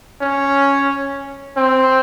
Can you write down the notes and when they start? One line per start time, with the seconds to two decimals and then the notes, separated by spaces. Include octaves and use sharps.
0.21 C#4
1.57 C4